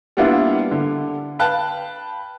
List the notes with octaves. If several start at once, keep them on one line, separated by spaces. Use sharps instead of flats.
G3 A#3 B3 D4 E4 F4
D3
B4 F5 G5 A5 F#6